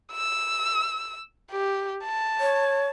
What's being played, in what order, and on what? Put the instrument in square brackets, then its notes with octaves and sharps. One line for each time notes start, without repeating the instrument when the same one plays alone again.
[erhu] E6
G4
A5
[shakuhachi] C#5